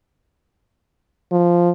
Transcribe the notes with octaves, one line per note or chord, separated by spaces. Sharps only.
F3